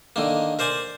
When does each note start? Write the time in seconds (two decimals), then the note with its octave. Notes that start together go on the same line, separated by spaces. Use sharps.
0.16 D3 D#3 A#3
0.59 A#4 C5 D5 G#5